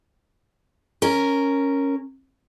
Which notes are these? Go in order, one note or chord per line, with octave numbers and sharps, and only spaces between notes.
C#4 A#4